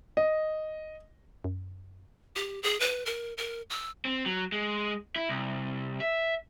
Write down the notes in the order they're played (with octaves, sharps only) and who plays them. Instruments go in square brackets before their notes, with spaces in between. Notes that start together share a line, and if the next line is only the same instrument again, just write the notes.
[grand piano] D#5
[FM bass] F#2
[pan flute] G4
G#4
B4
A#4
A#4
E6
[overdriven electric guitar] C4
F#3
G#3
E4
C2
E5